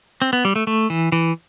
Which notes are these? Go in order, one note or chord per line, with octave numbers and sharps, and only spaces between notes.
C4
B3
G3
A3
A3
E3
E3